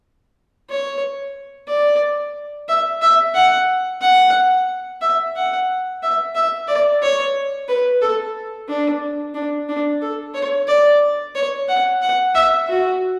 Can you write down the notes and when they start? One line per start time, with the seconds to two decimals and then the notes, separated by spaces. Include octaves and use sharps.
0.69 C#5
1.68 D5
2.68 E5
3.02 E5
3.35 F#5
4.01 F#5
5.01 E5
5.35 F#5
6.02 E5
6.35 E5
6.68 D5
7.02 C#5
7.69 B4
8.01 A4
8.69 D4
9.34 D4
9.69 D4
10.02 A4
10.34 C#5
10.67 D5
11.35 C#5
11.69 F#5
12.02 F#5
12.35 E5
12.68 F#4